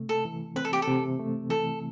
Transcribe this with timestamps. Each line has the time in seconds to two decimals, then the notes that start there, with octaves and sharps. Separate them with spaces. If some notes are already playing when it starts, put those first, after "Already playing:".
Already playing: C3 A3
0.09 A4
0.25 E3
0.56 C4 B4
0.65 A4
0.73 G4
0.82 A4
0.87 C3
1.19 A3
1.50 E3 A4